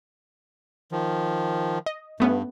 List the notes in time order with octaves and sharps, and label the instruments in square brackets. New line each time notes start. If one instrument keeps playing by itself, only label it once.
[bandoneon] D#3 F3
[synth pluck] D#5
[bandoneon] G2 [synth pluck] A3 B3 C#4